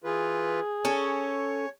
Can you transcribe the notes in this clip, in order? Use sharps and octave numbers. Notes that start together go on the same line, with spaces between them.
E3 F4 G#4 B4
C#4 A4 C#5